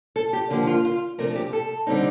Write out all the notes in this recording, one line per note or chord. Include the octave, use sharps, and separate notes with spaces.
A4
G4
D3 F3 A#3 G4
F4
F4
C3 F3 A3 D4 A#4
G4
A4
D3 G3 C4 D#4